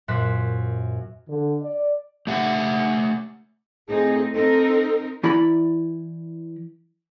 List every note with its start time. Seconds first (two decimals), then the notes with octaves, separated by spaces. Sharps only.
0.08 F#2 A#2 C5 F#6 B6
1.28 D3
1.61 D5
2.27 A3 G4 E5 F#5
3.89 A2 C4 D#4 G#4
4.33 C4 D#4 A4 A#4
5.23 E3 E4 D5 A#5 B5